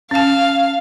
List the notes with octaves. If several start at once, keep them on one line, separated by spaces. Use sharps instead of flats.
C#4 F5 A5